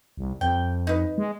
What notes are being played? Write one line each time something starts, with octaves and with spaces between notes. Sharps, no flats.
C2
F2 G5
D#4 B4
G#3